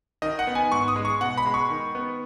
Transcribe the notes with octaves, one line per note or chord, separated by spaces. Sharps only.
D#3 D#5
F#5
B3
G#5
G#2 C#6
D#6
G#3
C#6
B2 F#5
B5
G#3
C#6
D#3
B3